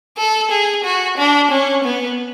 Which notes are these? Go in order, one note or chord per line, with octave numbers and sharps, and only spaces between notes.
A4
G#4
F#4
D4
C#4
B3